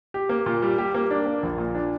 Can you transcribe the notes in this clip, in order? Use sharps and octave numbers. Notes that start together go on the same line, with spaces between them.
G4
A#3
A#2
G3
G4
A#3
D4
A#3
A#1
A#2
D4